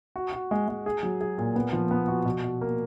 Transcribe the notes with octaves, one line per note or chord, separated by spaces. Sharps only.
F#4
F#4
G#3
G#3
G#4
F#3
G#4
A#2
B3
F3
B3
F#4
B2
B2
A#3